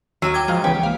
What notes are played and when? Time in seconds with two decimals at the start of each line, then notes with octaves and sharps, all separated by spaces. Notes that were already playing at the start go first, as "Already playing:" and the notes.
0.22 D#2 F#3 E6 F6 D#7
0.34 G5 D6 G#6
0.48 G#2 F3 F5
0.64 C#2 E3 B3 G4 C#5
0.83 A#3 F5